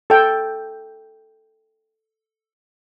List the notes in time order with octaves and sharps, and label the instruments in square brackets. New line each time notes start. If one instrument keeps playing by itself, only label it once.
[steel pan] A4 G5